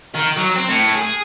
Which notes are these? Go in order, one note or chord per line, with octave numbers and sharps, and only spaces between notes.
D#3
F#3
C4
A2
G#4